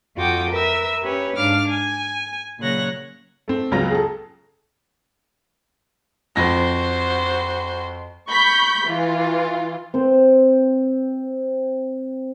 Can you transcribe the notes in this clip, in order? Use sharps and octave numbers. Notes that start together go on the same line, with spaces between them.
F2 F4 F#4 G5 D6 D#6
A#4 B4 E5
C#4 G4 B4 C#5
G#2 D4 F5 D6 F6
G#5
A#2 C#3 F#3 C#5 F#6 A#6
A3 C4
C#2 F#3 B3 F4 A#5 A#6
G#4 A4
F2 F#4 C5 A#6
B5 C#6 G6 B6
E3 F4
C4 C5